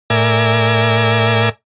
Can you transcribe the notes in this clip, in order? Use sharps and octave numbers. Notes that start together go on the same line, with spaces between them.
A2 A#4 D5 E5 G#5